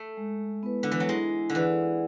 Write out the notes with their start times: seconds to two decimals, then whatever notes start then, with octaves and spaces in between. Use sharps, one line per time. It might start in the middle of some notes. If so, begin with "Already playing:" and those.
Already playing: A3
0.17 G#3
0.63 B3 E4 B4
0.83 D3
0.91 E3
1.00 F#3
1.08 G#3 E4
1.50 D3
1.55 E3 G#4 D5 F#5